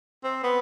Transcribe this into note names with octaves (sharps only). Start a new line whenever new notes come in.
C4
B3